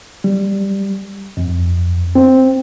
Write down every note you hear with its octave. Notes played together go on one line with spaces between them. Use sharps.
G3
F2
C4